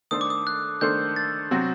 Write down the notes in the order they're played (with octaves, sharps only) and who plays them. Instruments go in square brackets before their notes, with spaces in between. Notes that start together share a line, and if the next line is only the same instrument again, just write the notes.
[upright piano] D#3 A3 D4 A4 C5 [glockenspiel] D#6
[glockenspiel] D6
D#6
F#6
[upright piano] D#3 A3 D4 A4 C5 [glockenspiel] G6
[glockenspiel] A6
[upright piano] C3 F#3 C4 F#4